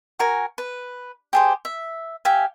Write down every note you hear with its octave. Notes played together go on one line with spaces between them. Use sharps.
F#4 A#4 G#5
B4
G4 G#4 C5
E5
G4 E5 F5 G#5